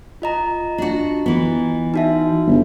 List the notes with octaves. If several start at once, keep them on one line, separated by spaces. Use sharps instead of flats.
F4 D#5 A#5
D4 F#4
E3 B3
D#4 F#4 E5
G1